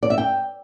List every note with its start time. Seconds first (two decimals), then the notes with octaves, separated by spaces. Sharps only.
0.03 D5
0.10 E5
0.18 G5